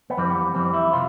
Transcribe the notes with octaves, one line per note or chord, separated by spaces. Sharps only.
B3
F2 E3 G3 C4
B3
F2 E3 G3 C4
E4
C3 F4